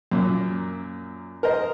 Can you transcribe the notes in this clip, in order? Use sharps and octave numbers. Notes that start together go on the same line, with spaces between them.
F#2 A#2
A#4 C5 D#5